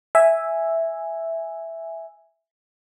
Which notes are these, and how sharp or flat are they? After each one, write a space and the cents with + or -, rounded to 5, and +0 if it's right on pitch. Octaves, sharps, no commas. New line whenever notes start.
E5 +0 G#5 -5